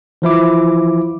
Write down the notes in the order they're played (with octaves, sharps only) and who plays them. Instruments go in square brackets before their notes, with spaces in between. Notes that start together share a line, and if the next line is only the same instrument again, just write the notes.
[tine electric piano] E3 F3 E4 D6